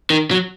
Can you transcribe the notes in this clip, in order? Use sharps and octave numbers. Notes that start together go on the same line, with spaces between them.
D#3
F#3